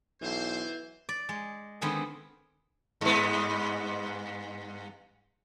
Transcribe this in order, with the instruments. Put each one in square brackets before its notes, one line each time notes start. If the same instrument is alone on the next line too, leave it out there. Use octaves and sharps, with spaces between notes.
[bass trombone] B1 [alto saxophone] E3 [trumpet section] C5
[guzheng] D5
G#3
D3 D#3 G#3 B3 C4
[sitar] G2 B3